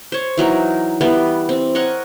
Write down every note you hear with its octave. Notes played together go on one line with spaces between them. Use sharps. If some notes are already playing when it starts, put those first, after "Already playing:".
C5 C#5
E3 F#3 D#4 A#4
E3 G3 B3
C4
A#4 C#5 D#5 F#5